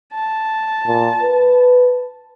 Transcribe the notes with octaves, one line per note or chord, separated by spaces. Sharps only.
A5
A#2
B4